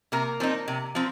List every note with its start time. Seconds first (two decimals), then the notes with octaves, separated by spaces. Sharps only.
0.12 C3 A#3 A#4
0.40 F3 C4 D#4
0.68 C3
0.95 F3 C4